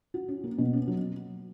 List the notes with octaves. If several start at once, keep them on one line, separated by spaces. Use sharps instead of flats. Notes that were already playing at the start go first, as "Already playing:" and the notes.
F#4
C#4
A#3
B2
C#4
F#3